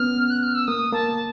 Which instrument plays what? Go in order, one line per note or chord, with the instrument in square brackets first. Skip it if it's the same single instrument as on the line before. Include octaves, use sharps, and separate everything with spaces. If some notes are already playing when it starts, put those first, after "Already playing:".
Already playing: [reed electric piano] B3 C#4 [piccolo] F6
[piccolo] F#6
F6
E6
[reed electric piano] A#3 [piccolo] D#6
[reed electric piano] A#3 [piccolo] A5